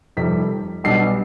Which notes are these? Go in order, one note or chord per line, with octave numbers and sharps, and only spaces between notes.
F1 F2 C3 D#3 G3 B6
B1 B2 G3 D4 C7